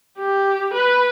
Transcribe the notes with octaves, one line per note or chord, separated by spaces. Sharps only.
G4
B4